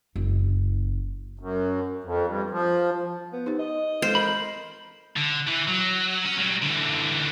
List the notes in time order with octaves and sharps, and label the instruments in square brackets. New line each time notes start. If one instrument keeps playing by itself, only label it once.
[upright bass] F#1
[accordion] F#2
F2
G2
F3
[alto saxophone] B3
[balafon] D#4 G4 C5
[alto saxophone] D#5
[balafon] G#3 A4 [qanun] C5
[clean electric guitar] A#4 B5
[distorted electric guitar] D3
E3
F#3
C#4
F#3 G3
D3 E3